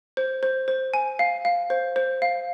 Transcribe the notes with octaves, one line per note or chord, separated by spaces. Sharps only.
C5
C5
C5
G#5
F5
F5
C5
C5
F5